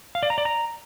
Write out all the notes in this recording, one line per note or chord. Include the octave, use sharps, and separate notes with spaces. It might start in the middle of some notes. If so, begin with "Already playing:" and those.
F5
D5
A#5
D5
A#5